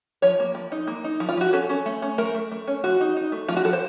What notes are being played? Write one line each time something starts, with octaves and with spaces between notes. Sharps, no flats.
F3 C#5
A#3
F3
D#4
A#3
D#4
F3
F4
F3 F#4
C#4 A4
C#4
A3
C#4
A3 A#4
A3
A3
C#4
F3 F#4
D#4
D#4
A3
F3 F4
F#4
F3 A4
C5